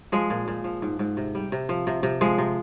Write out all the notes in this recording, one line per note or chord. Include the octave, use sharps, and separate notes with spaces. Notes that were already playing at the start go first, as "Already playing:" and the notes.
F3 G#3
A#2
A#2
F3
G#2
G#2
C3
G3
C3
F3
C3
C3
F3 G#3
C3